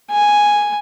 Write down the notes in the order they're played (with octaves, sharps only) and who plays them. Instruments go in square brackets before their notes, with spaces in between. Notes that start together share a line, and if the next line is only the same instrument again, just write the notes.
[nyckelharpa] G#5